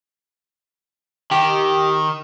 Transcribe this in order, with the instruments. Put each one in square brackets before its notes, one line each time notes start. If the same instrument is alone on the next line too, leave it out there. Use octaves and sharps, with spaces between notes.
[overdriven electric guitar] D#3 [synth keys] G4